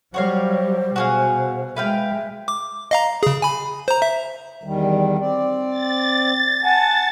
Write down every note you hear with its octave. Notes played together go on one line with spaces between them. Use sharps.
F#3 G3 F#4 C5 C#5 F5
B2 F#4 G#4 F5
G#3 B4 E5 F5 G5
D6
D#5 F5 A#5
C#3 G#4
G#5 B5
C5 A#5
E5
E2 D#3 G3
C4 D5
A6
F#5 G#5 A5